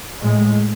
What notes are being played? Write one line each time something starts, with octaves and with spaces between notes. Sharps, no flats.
A2 G#3